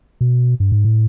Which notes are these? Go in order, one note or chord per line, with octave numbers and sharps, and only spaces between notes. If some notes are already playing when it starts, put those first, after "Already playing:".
B2
G2
G#2
A2